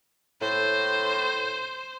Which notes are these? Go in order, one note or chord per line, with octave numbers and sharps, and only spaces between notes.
A2 C5